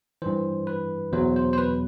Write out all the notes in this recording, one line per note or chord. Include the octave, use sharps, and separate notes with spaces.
G2 E3 C5
B4
E2 B2 F#3 C5
C5
C5
B4